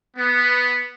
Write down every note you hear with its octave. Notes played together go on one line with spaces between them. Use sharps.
B3